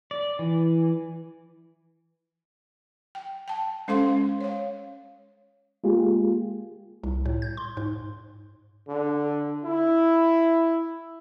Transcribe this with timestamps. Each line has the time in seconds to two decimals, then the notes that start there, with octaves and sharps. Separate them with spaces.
0.11 D5
0.39 E3
3.15 G5
3.48 G5 A5
3.88 G#3 C#4 A4 C5 F5 C6
4.41 C#5 F5
5.84 G#3 A#3 F4 G4 G#4
7.03 C2
7.26 A2
7.42 G6
7.57 C6
7.77 G#2
8.88 D3
9.64 E4